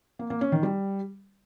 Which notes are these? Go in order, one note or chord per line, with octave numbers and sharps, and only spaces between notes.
A#3
A#3
C#4
D#3
G3